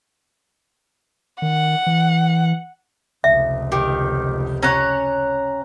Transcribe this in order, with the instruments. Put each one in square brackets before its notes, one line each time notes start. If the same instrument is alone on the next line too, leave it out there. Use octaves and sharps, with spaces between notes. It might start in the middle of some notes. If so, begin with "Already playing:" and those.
[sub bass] D#3 [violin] F#5
[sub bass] E3
[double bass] F1 C#2 [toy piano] E5
[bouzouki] D#3 [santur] G4
[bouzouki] C#4 C#5 [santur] F#5 A#5